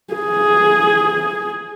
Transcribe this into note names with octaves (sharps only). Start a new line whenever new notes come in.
G#4